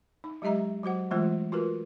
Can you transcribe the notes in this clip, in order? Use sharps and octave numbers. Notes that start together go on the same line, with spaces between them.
D#4
F#3 G#3 G4 D#5 E5 A#5
F#3 F#4 C5 F#5
E3 G#3 A3 B3 F4 C5
F4 F#4 A#4 B4